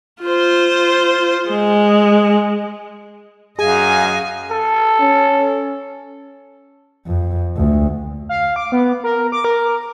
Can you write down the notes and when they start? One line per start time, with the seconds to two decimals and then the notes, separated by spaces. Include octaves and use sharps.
0.22 F4 C5
1.50 G#3
3.59 F#2 G#4 D#5 F5 G#5
4.51 A4
5.01 C#4
7.06 F2
7.56 D2
8.29 F5
8.56 D6
8.72 B3
9.04 A#4
9.32 D6
9.44 A#4